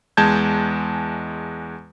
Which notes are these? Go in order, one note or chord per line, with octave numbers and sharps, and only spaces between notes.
E2 G#3 A5 G6 G#6